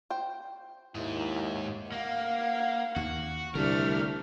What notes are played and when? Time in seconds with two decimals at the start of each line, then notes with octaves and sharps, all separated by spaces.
0.10 C5 G5
0.95 D#2 G#2 E4
1.92 A#3 F5 F#5
2.96 D#2 F#4
3.55 C2 D3 G3 A3 D4 A#4 F6